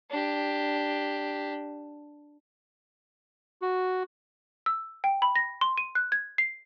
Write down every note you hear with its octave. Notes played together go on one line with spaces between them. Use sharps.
D4 G4
F#4
E6
G5
B5
A#6
C6
D#7
F#6
G#6
C7